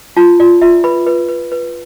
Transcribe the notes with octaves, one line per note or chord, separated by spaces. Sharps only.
F4 A5
F4 D5
F4 E5
B4 B5
B4
B4
B4